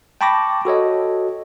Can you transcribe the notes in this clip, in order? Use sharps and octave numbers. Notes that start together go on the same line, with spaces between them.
G5 A5 B5 C#6 D6 A#6
F#4 A4 C#5 D#5